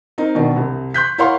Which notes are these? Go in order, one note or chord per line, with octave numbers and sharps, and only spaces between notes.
C4 D#4 A#4
B2 D#3 D4
C2 C3
C6 F#6 G6 B6
E4 A#4 C#5 F5 F#5 C6